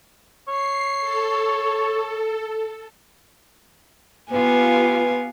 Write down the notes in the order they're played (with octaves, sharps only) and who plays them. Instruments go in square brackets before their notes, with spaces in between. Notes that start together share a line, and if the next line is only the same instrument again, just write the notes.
[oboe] C#5 [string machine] C7
[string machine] A4
[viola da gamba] B3 [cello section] F4 G4 F5 [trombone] B4 [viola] G#5